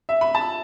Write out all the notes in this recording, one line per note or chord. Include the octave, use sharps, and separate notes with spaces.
E5
B5
A5